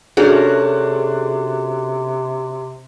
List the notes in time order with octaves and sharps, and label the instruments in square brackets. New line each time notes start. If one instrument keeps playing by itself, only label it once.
[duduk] C3 [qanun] A3 C#4 A#4 [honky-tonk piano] D4 F#4 [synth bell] G#4